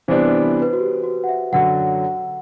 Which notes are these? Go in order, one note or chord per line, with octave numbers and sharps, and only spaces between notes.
C3 E3 G3 B3 D4 C5
B4
B4
F#4
G4
F#4
F#5
E5
F#2 D3 F#3 F#5